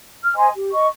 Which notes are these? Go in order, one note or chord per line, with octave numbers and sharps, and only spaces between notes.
F6
C5 D#5 G#5 C6
G4
D#5 C#6